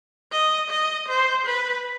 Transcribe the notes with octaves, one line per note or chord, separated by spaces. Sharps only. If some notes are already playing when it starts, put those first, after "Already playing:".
D#5
D#5
C5
B4